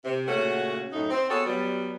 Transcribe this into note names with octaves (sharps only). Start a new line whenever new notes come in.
C3
A#2 C#3 A3 C#4 F#4 F#5
F#2 A2 A3 D#4
C4
B3 F#4 G#4 A4 C#5
F#3 G3 B3